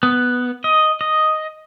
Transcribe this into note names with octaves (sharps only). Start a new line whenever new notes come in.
B3
D#5
D#5